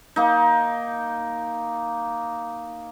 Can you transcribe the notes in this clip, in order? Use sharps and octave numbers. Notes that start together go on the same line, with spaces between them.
A#3 D#4